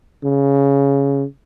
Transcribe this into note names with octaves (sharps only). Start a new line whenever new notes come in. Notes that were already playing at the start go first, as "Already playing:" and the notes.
C#3